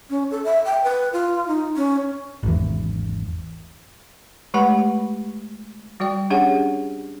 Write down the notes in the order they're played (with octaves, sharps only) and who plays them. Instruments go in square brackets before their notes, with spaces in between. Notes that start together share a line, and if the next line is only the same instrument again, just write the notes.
[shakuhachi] C#4
A4
E5
G5
B4
F4
D#4
C#4
[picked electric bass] G#1 E2
[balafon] G#3 A3 G4 B4 F#5 B5
G3 F#4 D5 G5
C#4 D4 G4 G#4 C#5 F#5